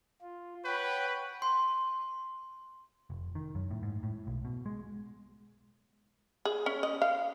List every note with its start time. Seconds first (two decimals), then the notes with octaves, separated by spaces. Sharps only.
0.21 F4
0.65 B4 C#5 F#5 G5
1.42 C6
3.10 F1
3.35 D#3
3.55 F#2
3.71 A2
3.83 G#2
4.03 A2
4.27 B1
4.45 B2
4.66 G#3
6.45 G#4
6.66 C#4
6.83 D#5
7.02 F5